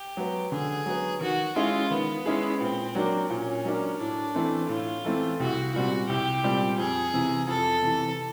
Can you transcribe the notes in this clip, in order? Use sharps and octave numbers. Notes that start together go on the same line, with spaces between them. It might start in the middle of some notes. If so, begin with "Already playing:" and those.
Already playing: G4
F#3 B3
D3 G#4
F#3 B3
D#3 F#4
G#3 C#4 E4 F4 G#4
D#3 B3
G#3 C#4 E4 G#4
A#2 C4
F#3 A#3 D4
A#2 C#4
F#3 A#3 D4
A2 D4
E3 A3 C4
A2 F4
E3 A3 C4
C2 F#4
A#2 G3 C4 F#4
C2 G4
A#2 G3 C4
F2 G#4
C3 E3
F2 A4
C3 E3